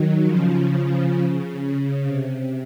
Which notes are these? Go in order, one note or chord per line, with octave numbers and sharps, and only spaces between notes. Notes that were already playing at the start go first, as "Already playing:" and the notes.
Already playing: D#3 F#3
C#3 F3
C#3
C3